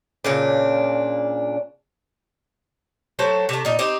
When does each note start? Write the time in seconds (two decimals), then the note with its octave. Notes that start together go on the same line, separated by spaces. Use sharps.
0.24 A#2 C#3 D4
3.19 F#3 A3 A4 C5
3.49 C3 A3
3.65 A#2 D#4
3.79 C4 D#4 G4